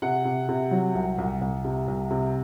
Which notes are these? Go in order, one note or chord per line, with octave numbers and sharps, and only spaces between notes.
C3 F#5
C3
C3
F#3
C2
C2
C2
C3
C2
C3